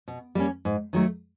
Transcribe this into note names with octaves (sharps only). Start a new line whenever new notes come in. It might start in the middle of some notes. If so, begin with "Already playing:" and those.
B2
G3 A#3 C#4
G#2
D#3 F#3 A3